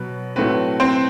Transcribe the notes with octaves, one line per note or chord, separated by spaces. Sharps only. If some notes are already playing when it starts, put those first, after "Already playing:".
Already playing: B2 F#3 B3 B4
A2 F#3 A3 C4 B4
C4 C5